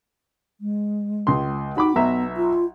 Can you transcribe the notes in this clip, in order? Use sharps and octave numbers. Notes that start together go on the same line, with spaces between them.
G#3
C#2 C6
D#4 F#4 B5 D6
B1 B3 E5 A#5
F4